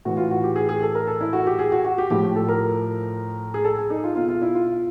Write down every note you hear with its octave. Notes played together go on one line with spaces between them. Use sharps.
A2 E3 F#4
F4
F#4
G4
G#4
G#4
A4
A#4
A4
E4
F#4
G4
G#4
F#4
F#4
G4
A2 F3 G4
A4
A#4
G#4
A4
G#4
D#4
F4
B2 F4
F4
E4
F4